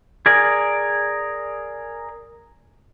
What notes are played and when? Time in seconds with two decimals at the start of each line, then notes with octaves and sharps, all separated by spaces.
0.26 G#4 A#4 D5